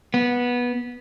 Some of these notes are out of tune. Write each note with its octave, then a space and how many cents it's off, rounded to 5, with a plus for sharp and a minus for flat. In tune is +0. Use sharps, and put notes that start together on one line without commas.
B3 -15